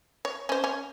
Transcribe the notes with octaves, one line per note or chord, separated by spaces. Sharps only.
C#5
C#4 C5
C#4